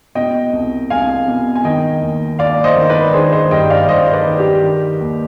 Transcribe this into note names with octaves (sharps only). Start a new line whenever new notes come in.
B2 D#5 G5
C2
C2 F5 G#5
B2
G#5
D#3 D#5 G5
D#2
D#2 D5 F5
C5 D#5
D#3
B4 D5
D#3 G#4 C5
C5 D#5
G2 D#5 G5
D5 F5
G2 C5 D#5
B4 D5
D#3
G4
D#3
D#2